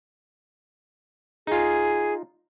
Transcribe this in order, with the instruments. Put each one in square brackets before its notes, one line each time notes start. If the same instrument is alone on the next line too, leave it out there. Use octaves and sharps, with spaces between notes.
[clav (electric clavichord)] D#4 F4 [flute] G#4